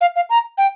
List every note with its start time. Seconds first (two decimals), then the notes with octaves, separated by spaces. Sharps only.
0.01 F5
0.16 F5
0.30 A#5
0.58 G5